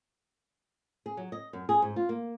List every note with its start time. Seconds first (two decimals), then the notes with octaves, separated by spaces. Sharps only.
1.06 G#4
1.17 F#3
1.32 D#5
1.53 F#2
1.69 G#4
1.82 G#2
1.96 F4
2.09 A#3